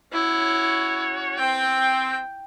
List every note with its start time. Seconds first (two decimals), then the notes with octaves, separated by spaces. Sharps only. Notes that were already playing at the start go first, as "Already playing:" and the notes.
0.13 C#4 E4 F#4 C#5
1.38 C4 G5